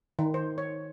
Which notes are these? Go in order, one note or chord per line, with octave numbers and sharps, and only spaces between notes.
D#3
C5
C#5